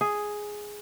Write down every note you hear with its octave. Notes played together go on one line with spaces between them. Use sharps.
G#4